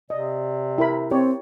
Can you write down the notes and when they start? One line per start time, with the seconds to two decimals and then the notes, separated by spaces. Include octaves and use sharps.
0.10 C3 D5 D#5
0.78 E4 A#4 B5
1.11 C4 G4 C#5 D5